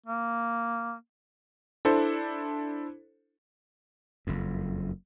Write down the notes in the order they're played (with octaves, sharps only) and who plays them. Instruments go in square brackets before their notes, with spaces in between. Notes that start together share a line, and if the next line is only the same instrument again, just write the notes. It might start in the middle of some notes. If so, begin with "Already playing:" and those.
[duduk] A#3
[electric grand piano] D4 E4 A4 C5
[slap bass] F#1 F2